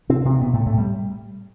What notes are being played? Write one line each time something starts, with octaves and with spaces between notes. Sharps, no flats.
C3 C4
C3 C4
B2 B3
A2 A3
A2 A3
G3